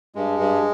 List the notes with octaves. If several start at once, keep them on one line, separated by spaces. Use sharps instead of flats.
G2 G#3
G2